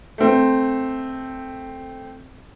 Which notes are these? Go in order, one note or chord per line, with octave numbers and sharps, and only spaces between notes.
A3 C4